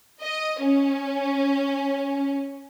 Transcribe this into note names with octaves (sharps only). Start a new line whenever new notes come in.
D#5
C#4